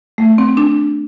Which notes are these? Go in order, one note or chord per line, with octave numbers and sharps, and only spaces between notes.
A3
C4
D4